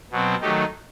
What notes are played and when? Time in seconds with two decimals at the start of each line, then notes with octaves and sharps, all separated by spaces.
0.11 B2 F#3 C4
0.41 D#3 F#3 A3 D#4 G4